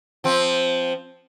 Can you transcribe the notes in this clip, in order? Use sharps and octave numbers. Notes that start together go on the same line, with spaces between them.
F3 C4